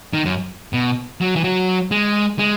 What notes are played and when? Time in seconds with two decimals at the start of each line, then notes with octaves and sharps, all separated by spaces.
0.14 D#3
0.25 F#2
0.73 B2
1.21 F#3
1.36 E3
1.44 F#3
1.91 G#3
2.39 G#3